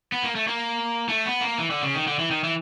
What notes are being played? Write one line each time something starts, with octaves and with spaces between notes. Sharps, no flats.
B3
A#3
A3
A#3
A3
B3
A#3
E3
D3
C#3
D#3
D3
E3
D#3
E3